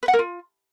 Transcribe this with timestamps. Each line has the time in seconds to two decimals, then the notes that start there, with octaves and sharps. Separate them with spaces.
0.03 B4
0.08 F#5
0.13 A#4
0.19 F4